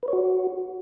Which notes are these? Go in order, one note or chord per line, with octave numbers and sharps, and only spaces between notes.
B4
C#5
F#4